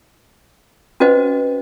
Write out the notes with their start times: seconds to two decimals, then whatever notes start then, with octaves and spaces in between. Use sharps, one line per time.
1.00 C#4 F#4 B4 C5 D#5 F#5